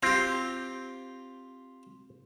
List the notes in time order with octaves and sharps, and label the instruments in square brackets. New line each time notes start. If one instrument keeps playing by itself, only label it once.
[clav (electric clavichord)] C4 [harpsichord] F4 G4